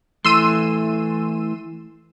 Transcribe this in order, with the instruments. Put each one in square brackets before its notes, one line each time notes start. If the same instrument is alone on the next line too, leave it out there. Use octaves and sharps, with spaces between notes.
[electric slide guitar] E3 A3 [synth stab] C6 E6 D#7